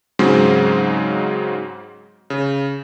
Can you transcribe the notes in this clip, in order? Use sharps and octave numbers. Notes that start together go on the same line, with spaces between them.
G#2 C#3 F#3 G#3 C4
C#3